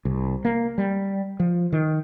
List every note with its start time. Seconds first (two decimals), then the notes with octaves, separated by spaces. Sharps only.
0.05 C2
0.45 A#3
0.78 G3
1.40 F3
1.72 D#3